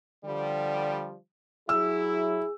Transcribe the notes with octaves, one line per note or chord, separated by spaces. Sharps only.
D3 F3 G3
F#3 E4 G#4 E6